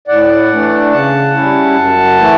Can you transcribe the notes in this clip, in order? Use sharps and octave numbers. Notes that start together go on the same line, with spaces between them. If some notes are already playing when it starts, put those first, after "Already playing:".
A2 D5 F#5
E3 A3 D4
C#3 F#5 A5
G3 C#4 E4
F#2
E3 A3 E4